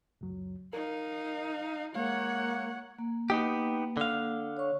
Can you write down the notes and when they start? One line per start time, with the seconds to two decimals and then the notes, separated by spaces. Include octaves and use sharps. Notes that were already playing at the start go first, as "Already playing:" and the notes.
0.21 C#2 F#2 F#3
0.73 D#4 A#4 F5
1.95 G#3 A#3 C#5 F5 F#5
2.99 A#3
3.30 B3 D#4 G4
3.97 D3 F5
4.57 C#5 C#6